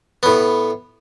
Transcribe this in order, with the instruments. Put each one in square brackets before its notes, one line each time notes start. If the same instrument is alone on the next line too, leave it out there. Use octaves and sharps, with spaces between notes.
[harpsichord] A2 B3